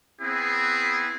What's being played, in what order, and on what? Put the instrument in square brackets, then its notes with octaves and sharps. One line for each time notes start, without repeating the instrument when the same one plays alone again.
[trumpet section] B3 C4 E4 G#4